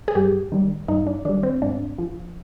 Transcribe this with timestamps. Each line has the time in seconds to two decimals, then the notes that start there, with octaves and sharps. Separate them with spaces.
0.08 G#4
0.15 G2 G4
0.52 D#3 G3
0.88 G2 D#4
1.07 D4
1.25 D#3 G3 D4
1.43 C4
1.62 G#2 D4
1.98 F3